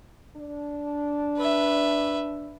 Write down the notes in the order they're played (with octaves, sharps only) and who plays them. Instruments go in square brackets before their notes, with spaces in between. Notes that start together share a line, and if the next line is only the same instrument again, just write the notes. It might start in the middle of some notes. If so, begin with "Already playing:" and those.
[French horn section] D4
[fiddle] B4 E5